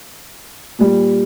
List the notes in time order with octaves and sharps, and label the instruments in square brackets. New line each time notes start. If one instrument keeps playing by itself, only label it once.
[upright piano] A#2 G3